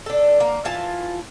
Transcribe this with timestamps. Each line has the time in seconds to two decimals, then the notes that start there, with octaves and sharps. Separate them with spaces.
0.06 D4 A4
0.40 A#3
0.65 E3 F4 A5